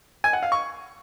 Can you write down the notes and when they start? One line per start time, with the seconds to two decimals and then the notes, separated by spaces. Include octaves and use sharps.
0.24 G#5
0.33 F#5
0.43 F5
0.52 C#6